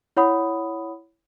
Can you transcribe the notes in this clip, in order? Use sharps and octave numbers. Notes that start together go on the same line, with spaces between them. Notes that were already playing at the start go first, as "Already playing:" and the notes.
E4 C#5 F#5 B5 D#6